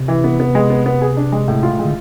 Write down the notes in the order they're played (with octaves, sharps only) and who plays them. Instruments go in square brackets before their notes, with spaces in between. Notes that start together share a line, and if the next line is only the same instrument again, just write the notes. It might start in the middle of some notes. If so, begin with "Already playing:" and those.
Already playing: [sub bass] C3
[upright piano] E3
B3
B3
G#3
B3
B3
G#4
D4
G#3
A2
F4
G#3
[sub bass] D3